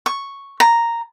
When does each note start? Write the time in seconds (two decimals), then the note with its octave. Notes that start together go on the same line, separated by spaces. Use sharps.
0.06 C#6
0.60 A#5